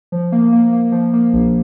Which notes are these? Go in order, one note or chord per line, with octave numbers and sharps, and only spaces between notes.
F3
A#3
A#3
A#3
F3
A#3
A#1